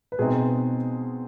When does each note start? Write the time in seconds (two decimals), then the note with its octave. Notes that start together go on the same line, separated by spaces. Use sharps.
0.12 B4
0.19 B2 G#3 C4 D#4 G#4